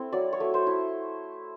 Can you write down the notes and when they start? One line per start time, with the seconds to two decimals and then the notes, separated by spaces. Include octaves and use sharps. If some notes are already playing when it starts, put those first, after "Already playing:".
Already playing: A3 C4 E4
0.12 F#3 D5
0.33 C#5
0.40 A3
0.54 C5
0.67 E4